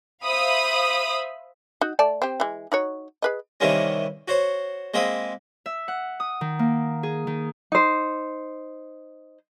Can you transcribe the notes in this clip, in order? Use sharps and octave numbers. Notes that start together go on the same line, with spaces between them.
C5 E5 F5 B5 D#6
D#4 F#4
A3 D5 A5
C4 G4
E3 G#3
D#4 F#4 C#5
G#4 B4 D#5
C3 D#3 E3 G3 A#3 C#4
F#4 C5 C#5
G#3 A#3 C4 B5 D#6
E5
F#5
D#6
D#3
A#3
G#4
D#3
D#4 C5